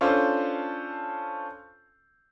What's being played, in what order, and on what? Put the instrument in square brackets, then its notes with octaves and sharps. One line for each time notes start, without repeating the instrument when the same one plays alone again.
[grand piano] C#4 D4 F4 A4 C5